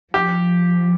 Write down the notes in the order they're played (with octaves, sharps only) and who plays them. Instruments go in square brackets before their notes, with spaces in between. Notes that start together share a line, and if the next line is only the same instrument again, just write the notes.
[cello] F3 [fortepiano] G4